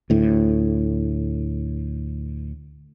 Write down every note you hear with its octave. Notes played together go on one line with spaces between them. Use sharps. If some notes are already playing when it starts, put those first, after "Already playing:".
D2 A2